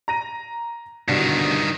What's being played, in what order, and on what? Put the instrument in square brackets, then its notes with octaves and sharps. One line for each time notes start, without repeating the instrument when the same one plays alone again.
[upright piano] A#5 A#6 D#7
[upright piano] C2 B2 D3 [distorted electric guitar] G2 D#3